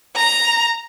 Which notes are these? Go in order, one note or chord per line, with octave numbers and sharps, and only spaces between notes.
A#5